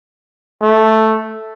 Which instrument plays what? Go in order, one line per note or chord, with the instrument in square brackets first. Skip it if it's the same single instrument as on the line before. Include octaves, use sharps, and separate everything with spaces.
[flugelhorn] A3